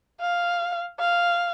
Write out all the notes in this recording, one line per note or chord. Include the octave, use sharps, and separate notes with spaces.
F5
F5